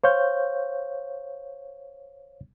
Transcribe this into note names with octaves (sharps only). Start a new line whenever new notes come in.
C5 C#5 F5 G6